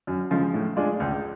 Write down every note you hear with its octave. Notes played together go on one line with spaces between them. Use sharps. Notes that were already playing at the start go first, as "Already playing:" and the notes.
F#2
C#3 F3 G#3
A2
G#3 D4 F4
C#2